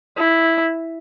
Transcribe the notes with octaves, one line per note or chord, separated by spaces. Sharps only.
E4